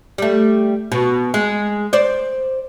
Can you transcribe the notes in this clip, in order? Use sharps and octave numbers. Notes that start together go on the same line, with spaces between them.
G3 A3
B2
G#3
C5 D5